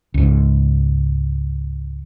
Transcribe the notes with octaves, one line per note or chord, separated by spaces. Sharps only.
C#2 G#2